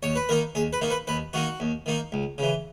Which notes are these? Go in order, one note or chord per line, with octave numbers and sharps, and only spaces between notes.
D#2 C#5
B4
D#3 A#3 D#4 A#4
D#2 G#4
B4
D#3 A#3 D#4
B4
D#2 B4
D#3 A#3 D#4 F#4
D#2
D#3 A#3 D#4
C#2
C#3 E3